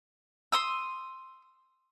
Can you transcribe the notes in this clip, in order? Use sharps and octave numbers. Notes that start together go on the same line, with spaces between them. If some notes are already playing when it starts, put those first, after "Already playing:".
C6 D#6 E6